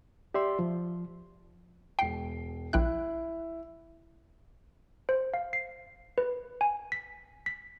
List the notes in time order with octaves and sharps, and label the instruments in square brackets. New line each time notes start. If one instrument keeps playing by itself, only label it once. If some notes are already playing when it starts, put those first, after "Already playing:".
[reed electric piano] G4 D5 E5 C6
F3
[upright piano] E1 C7 [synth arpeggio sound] G5
[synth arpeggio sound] A#1 G5 F#6 [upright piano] E4
[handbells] C5
F5
C7
B4
G#5
B6
B6